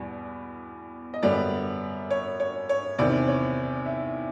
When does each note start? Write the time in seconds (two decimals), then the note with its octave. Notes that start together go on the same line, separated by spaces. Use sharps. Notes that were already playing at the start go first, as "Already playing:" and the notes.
Already playing: E2 B2 G3 B3
1.14 D#5
1.22 F#2 D3 G3 B3 D5
2.11 C#5
2.40 C#5
2.69 C#5
2.98 E2 C3 D#3 D5
3.28 C#5
3.86 E5